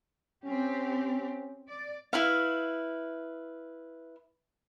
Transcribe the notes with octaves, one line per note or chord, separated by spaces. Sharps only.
C4 C#4 G4
D5
E4 B4 F5